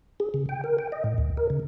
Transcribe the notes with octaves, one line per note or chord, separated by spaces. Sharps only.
G#4
C#3
G5
A#4
G5
D#5
A2
D2
A#4
C#3